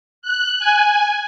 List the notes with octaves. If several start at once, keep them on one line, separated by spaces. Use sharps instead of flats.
F#6
G#5